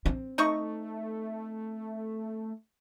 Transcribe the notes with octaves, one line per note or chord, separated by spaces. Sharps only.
C4
A3 D#4 D#5 C#6